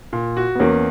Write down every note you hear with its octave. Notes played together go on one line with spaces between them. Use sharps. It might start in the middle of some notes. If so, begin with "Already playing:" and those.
A#2
F#4
B3
E2 A#3 C#4